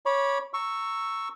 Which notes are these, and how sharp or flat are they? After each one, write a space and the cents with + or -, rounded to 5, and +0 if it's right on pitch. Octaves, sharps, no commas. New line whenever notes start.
C#5 +0 B5 -25 D6 +0
A#5 -20 C#6 +0 E6 +0